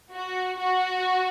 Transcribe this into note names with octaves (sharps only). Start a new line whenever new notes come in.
F#4
F#4